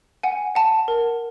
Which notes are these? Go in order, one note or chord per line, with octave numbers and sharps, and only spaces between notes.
F#5 G#5
F#5 A5
A#4